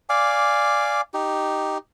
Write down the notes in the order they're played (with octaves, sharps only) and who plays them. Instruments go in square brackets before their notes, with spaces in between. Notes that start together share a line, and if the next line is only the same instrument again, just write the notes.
[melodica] D5 F5 G#5 D6
D#4 G4